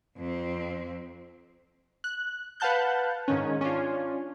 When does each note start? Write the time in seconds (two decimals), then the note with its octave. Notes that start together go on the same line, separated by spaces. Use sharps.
0.17 F2 C4
2.04 F#6
2.60 B4 F5 F#5 A5 F#6 G6
3.28 G#2 D#3 C#4
3.61 C#4 D4 F4